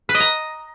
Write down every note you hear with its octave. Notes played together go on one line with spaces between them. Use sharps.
B4
D#5
A#5